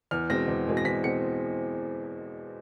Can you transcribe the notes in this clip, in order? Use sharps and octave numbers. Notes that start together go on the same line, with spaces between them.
E2 F6
B2 G#3 C4 A#6
E2
B2 G#3 C4
A#6
E2 B6
B2 G#3 C4 C#7